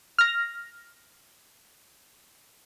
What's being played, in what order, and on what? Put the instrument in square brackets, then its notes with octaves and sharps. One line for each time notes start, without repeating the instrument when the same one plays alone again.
[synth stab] F6 A#6